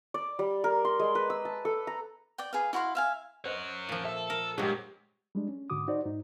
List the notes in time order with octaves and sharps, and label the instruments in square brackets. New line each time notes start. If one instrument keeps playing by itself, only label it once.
[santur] D5
G3
A#4
C6
G#3
B4
E6
A5
A4
A#5
[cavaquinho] D5 G5
G#4 B4 F5
E4 F#4 F5 C6
E5 F5 G#5
[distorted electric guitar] C#4 F#5 [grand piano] C5 D#5
[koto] A#2 F3
[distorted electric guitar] A4 [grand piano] E5
[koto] A#4
[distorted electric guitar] G2 [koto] A#2 F#3 [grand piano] G#3 G4
[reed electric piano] G3 G#3 D4
C#4
G#2 D3 F#4 D6 D#6
D#4 F#4 C5 D5
G#2 D#4